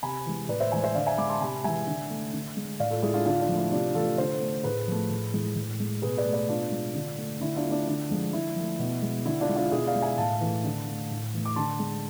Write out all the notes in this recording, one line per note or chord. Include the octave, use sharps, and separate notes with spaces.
C3 G#5 B5
E3 G#3
A2 B4 D5
C5 E5
E3 G#3 E5 G#5
C5 E5
D3 D5 F5
E5 G#5
G#3 B5 D6
A5 C6
C3 G#5 B5
E3 G#3 E5 G#5
D3
A3
D3
G#3
A2 D5 F5
F4 A4
G#3 E4 G#4
D4 F4
D3 D4 F4
D4
F3 A3
E4
C3 D4 F4
E3 A3 F4 A4
D3 A4 C5
A3
A2 G#4 B4
F3 A3
A2
E3 G#3
A2
G#3
B2 G#4 B4
B4 D5
A3
B4 D5
B2 D4 F4
G#3
D3
A3
D3 E4
D4 F4
A3
D4
D3
F3 G#3
D3 E4
F3 A3
B2
G#3
D3 E4
D4 F4
G#3
D4 F4
B2 E4 G#4
D5 F5
G#3
E5 G#5
A2 F5 A5
E3 A3
D3
A3
A2
E3 A3
D6
D3 A5 C6
G#3